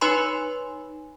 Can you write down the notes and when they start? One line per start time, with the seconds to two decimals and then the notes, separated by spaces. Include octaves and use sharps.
0.01 D#4 B4 C#5 G#5 B5 C6